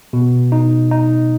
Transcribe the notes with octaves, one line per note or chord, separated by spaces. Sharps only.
B2
D#4
D#4